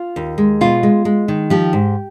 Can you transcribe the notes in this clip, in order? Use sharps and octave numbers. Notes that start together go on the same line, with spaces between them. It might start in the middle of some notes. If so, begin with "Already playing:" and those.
Already playing: F4
D#2
G#3
B2 F4
G#3
G#3
D#3
F3 G4
G#2